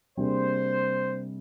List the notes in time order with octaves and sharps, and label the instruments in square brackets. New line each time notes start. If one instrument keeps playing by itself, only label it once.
[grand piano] C3 G3 A#3 D4 G#4 [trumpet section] C5